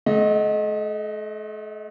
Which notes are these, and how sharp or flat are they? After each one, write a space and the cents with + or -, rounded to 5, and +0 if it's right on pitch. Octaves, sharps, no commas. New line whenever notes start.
A3 -40 D#5 +0 F#5 +0